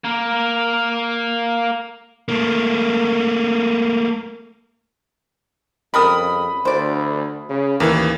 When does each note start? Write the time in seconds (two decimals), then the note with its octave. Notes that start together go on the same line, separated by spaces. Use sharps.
0.04 A#3 A#4
2.28 A3 A#3
5.94 F2 C#3 G3 A#4 B5 D#6
6.65 D2 C5 D5
7.49 C#3
7.80 A1 D#2 E3 A#3 C#4